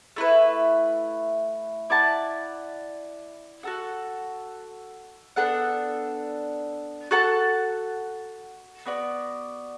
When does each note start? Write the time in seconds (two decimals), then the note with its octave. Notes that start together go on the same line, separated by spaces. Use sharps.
0.16 A3 E4 B4
1.90 E4 D5 F#5 A5
3.63 F#4 A4 F#5
5.36 B3 D4 A4 F#5
7.11 F#4 A4 F#5 A5
8.86 B3 F#4 D5